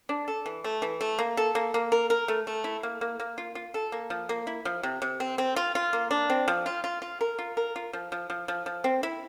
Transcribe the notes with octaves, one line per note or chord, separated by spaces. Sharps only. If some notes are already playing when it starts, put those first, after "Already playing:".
D4
A4
E3
A3
E3
A3
A#3
A4
A#3
A#3
A#4
A#4
A3
A3
E4
A#3
A#3
A#3
F4
F4
A4
A#3
F3
A#3
E4
F3
C3
C3
C4
C4
F4
F4
A#3
D4
C4
F3
F4
F4
F4
A#4
F4
A#4
F4
F3
F3
F3
F3
F3
C4
E4